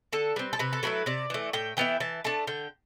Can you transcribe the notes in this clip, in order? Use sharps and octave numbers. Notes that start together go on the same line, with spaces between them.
D3 A4
G3 C4 B4
A4
C3 B4
A4
F#3 A3 E4 B4
C3 D5
E3 A3
A2 G5
E3 B3 E4 G5
E3 A5
A3 D4 A5
D3 G5